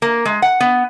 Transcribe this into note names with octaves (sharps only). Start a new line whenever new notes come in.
A#3
G#3
F#5
B3